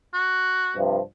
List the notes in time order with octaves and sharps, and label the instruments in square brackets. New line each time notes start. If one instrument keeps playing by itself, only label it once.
[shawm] F#4
[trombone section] G2 C3 F3